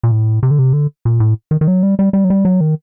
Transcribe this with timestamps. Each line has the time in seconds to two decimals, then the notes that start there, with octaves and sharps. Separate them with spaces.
0.03 A#2
0.11 A2
0.43 C3
0.51 D3
0.59 C3
0.73 D3
1.05 A#2
1.20 A2
1.51 D#3
1.61 D#3
1.68 F#3
1.83 G3
1.99 G3
2.13 G3
2.25 F#3
2.30 G3
2.45 F#3
2.61 D#3